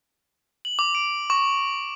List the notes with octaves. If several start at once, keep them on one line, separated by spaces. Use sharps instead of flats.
F#7
D6
D7
C#6